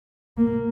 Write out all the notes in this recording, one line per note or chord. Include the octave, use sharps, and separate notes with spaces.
A#3